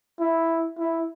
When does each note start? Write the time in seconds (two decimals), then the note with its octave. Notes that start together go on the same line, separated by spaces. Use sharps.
0.20 E4
0.79 E4